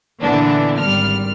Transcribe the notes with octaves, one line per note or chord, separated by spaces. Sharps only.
A#2 D3 E3 B3 D4
G#1 G3 F6